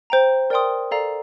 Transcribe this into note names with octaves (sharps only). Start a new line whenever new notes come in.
C5 G5 A#5
A#4 D5 G5 C6 D#6
A4 D5 F5 A#5